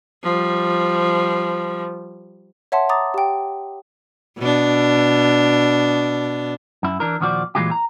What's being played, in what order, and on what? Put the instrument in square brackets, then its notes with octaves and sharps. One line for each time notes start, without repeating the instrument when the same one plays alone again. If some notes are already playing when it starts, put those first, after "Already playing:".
[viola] F3 G3
[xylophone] C#5 E5 F#5 A5 C6
A#5 D6 D#6 A6
G4 G5
[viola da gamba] B2 D4
[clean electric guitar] F#2 E4
E3 D4 A#4
D#2 A#2 F3 F#4 G#4 D5
A#2 E3 F#3 G#3 F4 G4
A#5